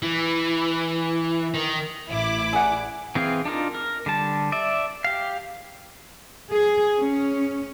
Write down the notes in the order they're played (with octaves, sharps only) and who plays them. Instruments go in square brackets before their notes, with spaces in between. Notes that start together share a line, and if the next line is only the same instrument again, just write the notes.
[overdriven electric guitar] E3
D#3
[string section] A1 E4 D6
[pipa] G#4 D5 F#5
[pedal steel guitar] E3 C4 G#4 F5
D4 D#4 F4 A#4
A#4
D3 G3 A5
D5 E5
G4 F5
[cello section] G#4
C#4